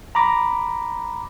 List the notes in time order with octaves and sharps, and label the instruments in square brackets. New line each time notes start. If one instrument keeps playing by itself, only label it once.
[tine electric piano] A#5 B5 D6 A#6